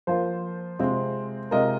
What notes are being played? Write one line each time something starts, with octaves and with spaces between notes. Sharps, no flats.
F3 A#3 F4 C5
C3 G#3 C4 F4
C3 G#3 F4 A#4 D#5